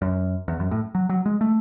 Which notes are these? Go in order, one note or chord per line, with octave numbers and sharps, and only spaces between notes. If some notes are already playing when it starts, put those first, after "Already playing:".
F#2
E2
F#2
A2
F#3
F#3
G#3
A3